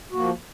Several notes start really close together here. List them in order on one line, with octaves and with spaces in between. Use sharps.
F#4 A#3 F3